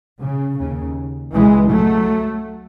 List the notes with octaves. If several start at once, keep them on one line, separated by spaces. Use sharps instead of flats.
C#3
D#2 C#3
C#2 B2 E3 G#3
F#3 A3